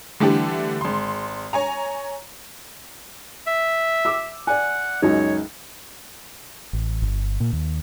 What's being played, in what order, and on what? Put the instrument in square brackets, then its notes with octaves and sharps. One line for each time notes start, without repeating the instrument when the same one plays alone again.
[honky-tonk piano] D3 E3 G3 A3 D4 G4
G#1 C6
C#5 G#5 A#5
[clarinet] E5
[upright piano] D6 E6
[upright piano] D5 G#5 [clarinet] F#5
[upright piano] C#2 F#2 D#4 [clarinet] C#5
[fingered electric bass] A1
G1
A#2
D#2